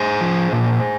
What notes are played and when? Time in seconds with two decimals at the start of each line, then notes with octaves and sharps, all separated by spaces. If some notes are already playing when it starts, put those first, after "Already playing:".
Already playing: G#4 C5
0.21 F3
0.53 A#2